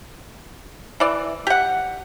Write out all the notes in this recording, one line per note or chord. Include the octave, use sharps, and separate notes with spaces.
E3 D5
G4 F#5